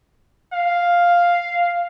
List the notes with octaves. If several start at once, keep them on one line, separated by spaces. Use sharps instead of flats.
F5